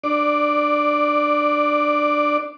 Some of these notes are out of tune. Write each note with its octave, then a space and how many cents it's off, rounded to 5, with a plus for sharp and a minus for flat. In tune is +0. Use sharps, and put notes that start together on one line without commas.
D4 +20 D5 +0